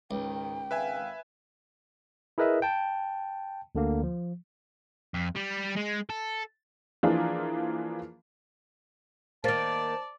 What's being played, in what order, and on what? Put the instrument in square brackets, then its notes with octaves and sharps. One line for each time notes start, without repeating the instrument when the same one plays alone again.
[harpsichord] C#2 [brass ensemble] G#2 D#3 [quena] G5
[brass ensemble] G#1 F5 [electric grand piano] B4 E5 G#5
[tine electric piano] E4 G#4 A#4 B4 D#5 E5
G5 A5
D2 D3 A#3
F3
[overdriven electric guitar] F2
G3
G#3
A4
[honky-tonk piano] E3 F3 A#3 D4 F4 G#4
[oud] D#3 A#3 [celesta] C5 A6 D7 [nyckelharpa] D5 [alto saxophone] A5